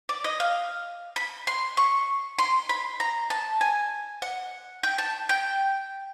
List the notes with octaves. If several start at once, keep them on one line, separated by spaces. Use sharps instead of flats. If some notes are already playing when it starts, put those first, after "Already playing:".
D5
D#5
F5
B5
C6
C#6
C6
B5
A#5
A5
G#5
F#5
G5
A5
G5